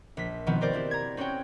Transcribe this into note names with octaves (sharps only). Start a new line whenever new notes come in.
A#1 B6
B2 D#3 F3 B3 C4
G4 A#4 C5 D5
C4 E4 G4
A#5 G#6
C4 C#4 F#4 C#5 G5